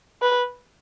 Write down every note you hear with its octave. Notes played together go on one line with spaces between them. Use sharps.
B4